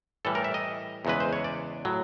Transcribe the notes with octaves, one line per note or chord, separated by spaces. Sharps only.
A2 E3 G3 A4
A#4
E5
D#5
E2 C#3 E3 G#3 B4
C5
C#5
D5
A2 F#3